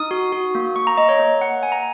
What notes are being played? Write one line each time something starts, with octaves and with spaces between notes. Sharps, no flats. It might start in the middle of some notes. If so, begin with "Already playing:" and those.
Already playing: D#4 D#6
F#4
F#4
A#3
A#3 C#6
A#5
A#3 D#5
C#5
A#3
A#3 F#5
A#3 G#5
A#5